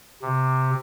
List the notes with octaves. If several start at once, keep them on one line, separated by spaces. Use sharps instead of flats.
C3